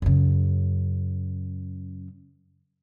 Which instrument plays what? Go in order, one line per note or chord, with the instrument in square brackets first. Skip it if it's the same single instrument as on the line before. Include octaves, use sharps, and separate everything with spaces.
[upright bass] F#2 C#3